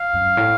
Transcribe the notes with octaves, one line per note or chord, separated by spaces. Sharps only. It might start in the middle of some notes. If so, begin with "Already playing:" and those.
Already playing: F5
F#2
A2